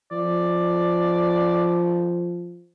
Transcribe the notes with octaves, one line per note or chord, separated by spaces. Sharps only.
F3 D5